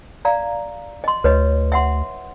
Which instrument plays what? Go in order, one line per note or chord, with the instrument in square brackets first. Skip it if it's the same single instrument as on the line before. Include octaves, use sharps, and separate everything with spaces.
[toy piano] D5 F5 A#5
D#5 C6
[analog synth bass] D2 [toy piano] B4 C#5 D#5
[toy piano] E5 F#5 C6